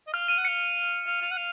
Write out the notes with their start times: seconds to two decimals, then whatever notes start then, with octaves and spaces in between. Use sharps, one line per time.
0.07 D#5
0.13 F5 F6
0.28 F5 D#7
0.38 F#5
0.45 F5 C#7
1.06 F5
1.21 F5
1.31 F#5
1.37 F5